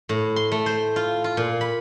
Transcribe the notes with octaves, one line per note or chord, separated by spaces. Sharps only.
A2
C6
A3
C5
F4
F4
A#2
B5